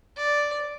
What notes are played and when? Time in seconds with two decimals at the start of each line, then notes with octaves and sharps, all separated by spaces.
0.17 D5